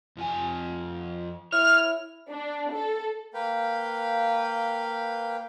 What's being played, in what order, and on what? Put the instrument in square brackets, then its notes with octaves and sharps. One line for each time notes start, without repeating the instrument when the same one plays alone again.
[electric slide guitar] F2 F3 G#5
[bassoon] E4 [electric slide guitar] C#5 [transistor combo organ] F6
[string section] D4
A4
[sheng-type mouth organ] A#3 B4 F5 G5